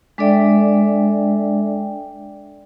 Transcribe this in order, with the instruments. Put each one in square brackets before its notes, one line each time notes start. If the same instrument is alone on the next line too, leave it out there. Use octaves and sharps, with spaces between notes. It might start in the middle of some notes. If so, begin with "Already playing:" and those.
[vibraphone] G#3 D4 A4 D5 E5 G5